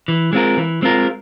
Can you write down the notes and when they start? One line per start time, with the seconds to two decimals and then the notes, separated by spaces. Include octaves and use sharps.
0.08 E3
0.33 G#3 C4 F4 A#4
0.57 E3
0.82 G#3 C4 F4 A#4